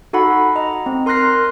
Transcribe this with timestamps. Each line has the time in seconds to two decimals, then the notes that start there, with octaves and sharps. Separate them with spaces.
0.13 D#4 F#4 A4 F#5 B5
0.56 D#5 A#5
0.86 C4
1.06 A#4 C6 F6 F#6 A#6 C7